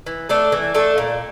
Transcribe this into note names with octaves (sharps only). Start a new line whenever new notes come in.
E3
A3 D4 A4
E3
A3 D4 A4
A#2